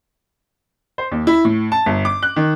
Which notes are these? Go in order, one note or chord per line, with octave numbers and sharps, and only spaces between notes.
C5
D#2
E4
A2
A5
G1
D6
F#6
D#3